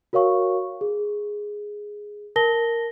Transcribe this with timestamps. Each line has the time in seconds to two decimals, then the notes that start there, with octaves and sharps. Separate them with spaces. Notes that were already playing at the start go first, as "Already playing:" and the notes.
0.13 F#4 A#4 C#5 F5 C#6
0.81 G#4
2.36 A#4 A5 A#6 G7